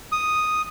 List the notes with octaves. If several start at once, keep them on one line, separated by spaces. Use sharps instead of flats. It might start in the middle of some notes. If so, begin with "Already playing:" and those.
D#6